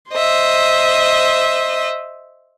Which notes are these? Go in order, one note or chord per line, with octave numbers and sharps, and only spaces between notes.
C5 D#5 E5